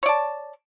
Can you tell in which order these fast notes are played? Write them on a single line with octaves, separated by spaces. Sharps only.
C#5 D5 A5